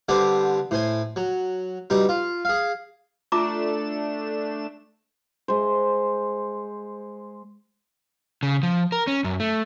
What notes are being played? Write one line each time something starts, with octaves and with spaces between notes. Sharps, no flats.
D3 G3 B3 C4 D4
A2 C5 G#5
F#3
B2 G3 D#4
F4
G#4 F5
A3 D4 F4 A#5 D6 E7
G#3 C5
C#3
F3
A#4
C#4
F#2
A3